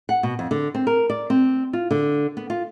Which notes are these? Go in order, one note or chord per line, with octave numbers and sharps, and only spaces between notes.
F#5
B2
F2
D3
C4
A#4
D5
C4
F4
D3
B3
F4